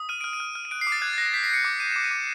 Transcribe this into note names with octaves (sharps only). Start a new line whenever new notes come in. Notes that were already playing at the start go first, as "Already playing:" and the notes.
Already playing: D#6
F6 D#7
F6 D7
D#7
F6
F6
D#7
F#6 D7
C7
D6
A6
F#6 G#6
A6
F#6 A#6
G6 B6
C7
G6 C#7
D6
G6 D#7
D6 E7
D#7
D6